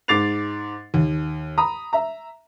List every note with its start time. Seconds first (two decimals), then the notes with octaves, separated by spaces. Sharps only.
0.08 G#2 D6 A6 C7 F7
0.94 D#2
1.58 A#5 B5 D#6
1.93 E5 A#5